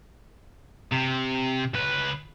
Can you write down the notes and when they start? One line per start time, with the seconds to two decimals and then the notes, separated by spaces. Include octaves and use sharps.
0.92 C3
1.74 C#2 B4